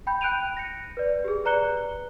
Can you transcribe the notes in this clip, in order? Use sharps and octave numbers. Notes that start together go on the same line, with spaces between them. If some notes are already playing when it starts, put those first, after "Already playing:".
G5 B5 G6
G5 F#6 G6 D7 D#7 F7
A#6 C#7
B4 D5
G4 G#4
B4 D5 A#5 F#6 C#7 G7